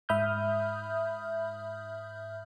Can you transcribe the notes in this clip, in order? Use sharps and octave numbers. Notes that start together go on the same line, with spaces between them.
G#2 E5 B5 D#6 F6 G6